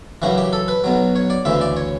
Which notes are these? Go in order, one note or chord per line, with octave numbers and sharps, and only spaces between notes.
F#2 C#3 E3 F#4
G4
A4
B4
B1 B2 F#3
C#5
D5
D2 C#3 E3 E5
D5
C#5